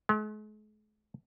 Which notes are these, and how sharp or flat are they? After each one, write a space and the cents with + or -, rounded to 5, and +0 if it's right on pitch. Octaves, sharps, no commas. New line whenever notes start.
G#3 +45